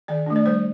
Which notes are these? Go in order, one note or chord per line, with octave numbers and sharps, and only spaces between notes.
D#3 D5
A3 D4
D5
G3 C5